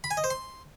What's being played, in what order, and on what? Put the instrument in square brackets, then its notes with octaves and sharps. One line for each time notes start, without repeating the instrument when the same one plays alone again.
[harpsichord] B5
G#5
D#5
C5
C6